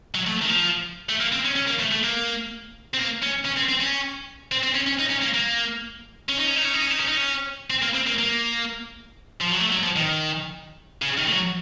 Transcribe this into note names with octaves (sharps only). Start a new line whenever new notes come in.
F#3
A3
D#3
F3
A3
A#3
C4
C#4
C#4
A#3
A3
A3
A#3
C4
A#3
C#4
C#4
C4
C4
C#4
C4
C4
C#4
C#4
D#4
C#4
A#3
A#3
C#4
D#4
C#4
D#4
C#4
D#4
C#4
D#4
C#4
D#4
C#4
C4
A#3
C4
A#3
A#3
F3
F#3
A3
F#3
F3
D#3
C#3
D#3
A3
F#3